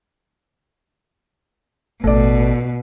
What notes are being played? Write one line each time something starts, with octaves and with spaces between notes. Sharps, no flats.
A1 B2 A3 A4 D5